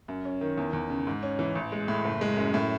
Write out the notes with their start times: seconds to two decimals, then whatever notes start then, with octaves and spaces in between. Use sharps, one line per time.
0.08 F#2
0.25 C#4
0.41 D#3
0.58 E2
0.73 E2
0.90 C#3
1.07 G#2
1.23 C#4
1.39 E3
1.55 A1
1.72 G#3
1.88 A2
2.05 F#1
2.21 G#3
2.37 F#2
2.54 A2